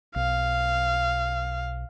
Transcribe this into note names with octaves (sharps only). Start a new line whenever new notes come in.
B1 F5